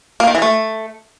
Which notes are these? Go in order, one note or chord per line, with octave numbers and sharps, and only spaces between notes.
A#3
D#3
E3
A3